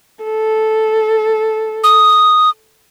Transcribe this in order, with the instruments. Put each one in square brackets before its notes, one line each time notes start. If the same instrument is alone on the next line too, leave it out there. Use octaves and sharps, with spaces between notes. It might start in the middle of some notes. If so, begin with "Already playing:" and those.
[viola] A4
[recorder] D#6